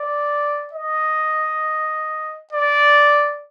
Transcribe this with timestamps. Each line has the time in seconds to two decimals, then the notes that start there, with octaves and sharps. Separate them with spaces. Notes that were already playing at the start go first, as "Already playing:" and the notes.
Already playing: D5
0.73 D#5
2.53 D5